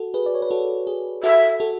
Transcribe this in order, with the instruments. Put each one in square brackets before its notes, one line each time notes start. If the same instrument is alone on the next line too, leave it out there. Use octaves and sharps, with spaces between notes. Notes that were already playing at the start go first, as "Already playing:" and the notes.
Already playing: [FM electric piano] F#4 A4
G#4 B4
D5
C#5
B4
F#4 A4
G#4
[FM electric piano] F#4 A4 [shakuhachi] E5
[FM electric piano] F#4 A4